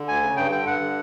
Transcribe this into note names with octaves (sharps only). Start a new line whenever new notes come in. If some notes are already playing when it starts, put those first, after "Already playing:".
Already playing: D3
D2 G#5
C#3
G2 G5
D3 G5
G2 F#5
D3